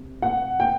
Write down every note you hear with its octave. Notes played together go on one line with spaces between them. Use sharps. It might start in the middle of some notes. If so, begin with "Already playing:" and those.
Already playing: C3
F#5
G5